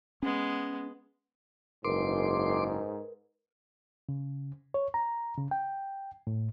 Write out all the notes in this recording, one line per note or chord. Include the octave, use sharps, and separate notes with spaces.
G#3 B3 C#4
F#1 G#2 A#4 B4 C6 D6
C#3
C#5
A#5
C#3
G5
A2